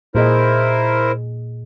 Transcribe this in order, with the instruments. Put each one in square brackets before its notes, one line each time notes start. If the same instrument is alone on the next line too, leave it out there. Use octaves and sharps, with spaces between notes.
[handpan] A#2 G#4 D#5 [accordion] E4 A#4 C5